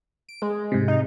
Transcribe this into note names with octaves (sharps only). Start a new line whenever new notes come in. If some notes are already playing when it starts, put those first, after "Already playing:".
D7
G#3
G#2 C3
D#4